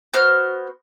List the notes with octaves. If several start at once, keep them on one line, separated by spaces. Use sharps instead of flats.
B3 F#4 C5 F6